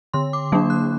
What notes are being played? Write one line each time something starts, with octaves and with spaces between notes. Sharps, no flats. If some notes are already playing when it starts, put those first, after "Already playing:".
D3 C6
D6
F#3 A#3 D4
F#6